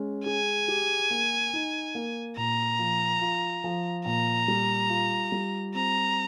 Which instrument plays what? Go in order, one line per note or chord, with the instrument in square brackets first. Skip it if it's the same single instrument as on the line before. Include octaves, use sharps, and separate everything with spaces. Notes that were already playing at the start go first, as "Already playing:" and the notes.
Already playing: [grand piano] G#3 C#4
[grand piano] G#4 [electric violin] G#5
[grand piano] G4
A#3
D#4
A#3
[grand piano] A#2 [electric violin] A#5
[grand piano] F3
F4
F3
[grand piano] A#2 [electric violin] A#5
[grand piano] G3
F4
G3
[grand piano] C4 [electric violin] A#5